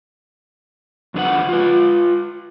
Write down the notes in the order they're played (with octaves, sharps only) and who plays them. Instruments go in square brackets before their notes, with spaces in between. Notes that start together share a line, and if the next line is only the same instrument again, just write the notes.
[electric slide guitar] F2 D3 D4 B4 F#5
F4 B4